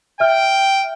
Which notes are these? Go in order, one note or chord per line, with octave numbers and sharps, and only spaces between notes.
E5 G5 F6